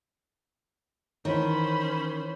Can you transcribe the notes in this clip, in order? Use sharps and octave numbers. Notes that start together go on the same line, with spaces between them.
D#3 E3 C#4 C5 C#5 B5